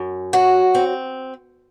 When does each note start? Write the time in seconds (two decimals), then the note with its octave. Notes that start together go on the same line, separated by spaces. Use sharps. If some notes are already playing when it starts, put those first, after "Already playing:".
Already playing: F#2
0.33 F#3 F#4
0.75 C4